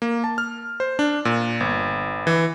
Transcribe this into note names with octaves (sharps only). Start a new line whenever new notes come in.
A#3
A5
F6
C5
D4
A#2
G1
E3